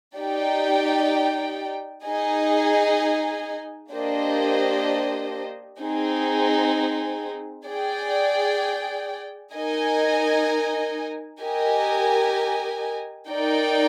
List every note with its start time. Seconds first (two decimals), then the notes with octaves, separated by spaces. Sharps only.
0.18 D#4 G4 D5 G5
2.05 D#4 G#4 D#5 G#5
3.92 A#3 D4 G4 C5 D#5
5.80 C4 D#4 G#4
7.67 G#4 D5 G5
9.55 D#4 A#4 D#5 G#5
11.42 G4 A#4 D#5 G#5
13.29 D#4 A#4 D5 G5